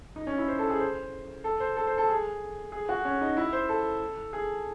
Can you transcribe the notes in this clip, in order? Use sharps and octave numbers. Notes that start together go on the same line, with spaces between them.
D#4
C#4
E4
C5
A4
G#4
C5
A4
C5
A4
C5
A4
G#4
G#4
F#4
C#4
D#4
E4
C5
A4
G#4